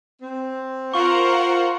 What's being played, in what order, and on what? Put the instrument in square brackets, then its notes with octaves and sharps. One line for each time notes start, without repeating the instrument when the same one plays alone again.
[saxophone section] C4
[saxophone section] F4 [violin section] A#4 C5 F#5 [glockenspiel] C#6